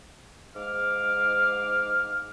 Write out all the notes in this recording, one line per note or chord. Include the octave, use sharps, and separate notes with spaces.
G#2 F5 D6 F6